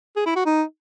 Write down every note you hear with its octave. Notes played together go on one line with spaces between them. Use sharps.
G#4
E4
F#4
D#4